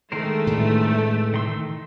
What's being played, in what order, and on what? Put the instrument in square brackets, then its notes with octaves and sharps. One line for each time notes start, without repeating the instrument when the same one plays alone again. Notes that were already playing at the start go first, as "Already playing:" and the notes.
[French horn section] D3 G#3 [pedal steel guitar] D#3 A#4 C5 [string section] A3
[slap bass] A2 C3 E3
[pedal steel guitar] D#3 C6 E6